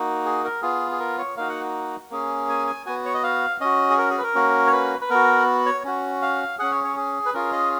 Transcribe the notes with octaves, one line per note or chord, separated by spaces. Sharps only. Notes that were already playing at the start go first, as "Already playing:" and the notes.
Already playing: A#3 D#4 F#4
G#4
A#4
B3 F4 G#4
G#4
A#4
C#5
A#3 D#4 F#4 F5
F#5
A#3 C#4 G#4
G#5
G#5
B3 F#4 G#5
C#5
D#5
F5
C#4 F#4 D#5
G#4
A#4
G#4
B4
A#4
A#3 C#4 F#4
C#5
B4
B4
B3 F#4 A#4
C#5
C#4 F#4
F5
C#4 G#4 F#5
C#5
C#5
G#4
B4
C#4 F4 G#4 A#4
D#5